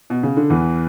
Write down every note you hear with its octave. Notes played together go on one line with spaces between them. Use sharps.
B2
C#3
D3
E2 E3